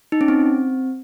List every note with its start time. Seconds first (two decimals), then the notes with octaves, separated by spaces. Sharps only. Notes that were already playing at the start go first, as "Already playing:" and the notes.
0.12 D#4
0.21 C#4
0.28 C4